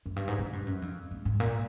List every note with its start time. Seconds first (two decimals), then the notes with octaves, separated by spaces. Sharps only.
0.06 F#2
0.16 G2
0.28 G#2
0.38 A2
0.53 G2
0.67 F#2
0.82 F2
1.11 G#2
1.25 G#2
1.40 A#2